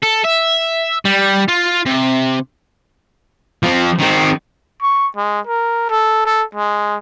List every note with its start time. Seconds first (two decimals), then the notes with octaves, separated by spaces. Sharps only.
0.03 A4
0.25 E5
1.05 G3
1.49 F4
1.86 C3
3.63 F3 C4
3.99 D#3 C4
4.82 C#6
5.17 G#3
5.47 A#4
5.90 A4
6.26 A4
6.55 G#3